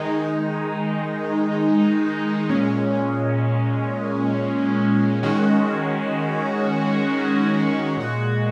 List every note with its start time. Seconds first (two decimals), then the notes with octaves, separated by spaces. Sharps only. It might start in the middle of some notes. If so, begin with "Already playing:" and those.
Already playing: D#3 G#3 D#4
2.49 A#2 G#3 C#4
5.23 D#3 G#3 C#4 F#4
7.97 A#2 G#3 F#4